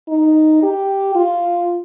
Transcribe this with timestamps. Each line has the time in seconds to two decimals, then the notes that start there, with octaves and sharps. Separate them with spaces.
0.09 D#4
0.63 G4
1.15 F4